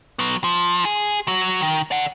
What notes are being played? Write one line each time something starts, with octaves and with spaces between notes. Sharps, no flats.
F#3 B3
F3
G#4
F#3 F#4
D#3
D5 F#5